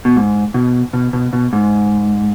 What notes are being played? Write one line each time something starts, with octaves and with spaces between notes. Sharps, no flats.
B2
G#2
B2
B2
B2
B2
G#2